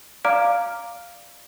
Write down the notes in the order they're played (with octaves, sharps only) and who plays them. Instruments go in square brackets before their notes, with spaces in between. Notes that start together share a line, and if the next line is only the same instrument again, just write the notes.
[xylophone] D5 F5 A#5 D6 F6 D7